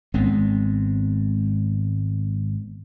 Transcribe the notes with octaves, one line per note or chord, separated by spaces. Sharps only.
G#1 G#3 B3 C4